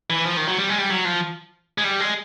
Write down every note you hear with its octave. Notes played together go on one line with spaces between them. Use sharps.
E3
F3
D#3
F#3
G3
G#3
G3
F#3
F3
G#3
G3
G#3